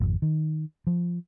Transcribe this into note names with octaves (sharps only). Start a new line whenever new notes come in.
G#1 F2
D#3
F3